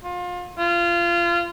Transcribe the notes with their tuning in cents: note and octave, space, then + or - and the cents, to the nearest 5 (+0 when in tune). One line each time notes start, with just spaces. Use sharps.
F4 +30
F4 -25